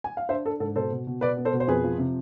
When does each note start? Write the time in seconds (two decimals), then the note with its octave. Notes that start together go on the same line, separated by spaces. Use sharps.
0.04 G#5
0.17 F5
0.29 D4 C5 E5
0.46 D4 A4
0.60 G#2 A4
0.76 B2 A4 C5
0.91 B2
1.07 B2
1.21 B2 B4 D5
1.37 B3
1.45 A4 C5
1.53 B2
1.60 C5
1.67 F2 G#4 B4
1.84 F3
1.98 C3